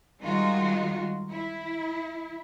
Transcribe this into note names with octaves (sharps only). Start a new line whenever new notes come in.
D#3 G3 G#3 D#4 F4 F#4
E4